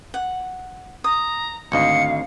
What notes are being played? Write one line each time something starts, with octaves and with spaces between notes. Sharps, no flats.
F#5
A#5 D#6
G#1 D2 D#5 F5 C#7